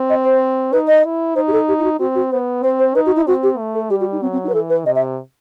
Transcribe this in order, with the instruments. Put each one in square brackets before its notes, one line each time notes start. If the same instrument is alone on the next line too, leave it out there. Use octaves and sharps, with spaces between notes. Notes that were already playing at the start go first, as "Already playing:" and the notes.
Already playing: [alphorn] C4
[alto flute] D#5
C5
[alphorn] D#4 [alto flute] B4
[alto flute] D#5
[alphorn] E4
[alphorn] D#4 [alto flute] C5
[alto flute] G4
A4
G4
E4
F#4
[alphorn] C4 [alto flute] F#4
[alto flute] F#4
[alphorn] B3 [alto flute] C5
[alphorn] C4 [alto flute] C5
[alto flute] C5
[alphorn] D#4 [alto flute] B4
[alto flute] F#4
E4
[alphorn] C4 [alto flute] F#4
[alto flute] G4
[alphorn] A3
[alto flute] A4
[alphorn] G3 [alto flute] G4
[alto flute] F#4
D#4
[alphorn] F#3 [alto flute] C4
[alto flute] C4
D#4
B4
[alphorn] E3 [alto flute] A4
[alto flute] B4
[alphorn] C3 [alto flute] D#5
[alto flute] E5